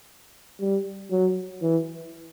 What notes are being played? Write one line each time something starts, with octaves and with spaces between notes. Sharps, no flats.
G3
F#3
E3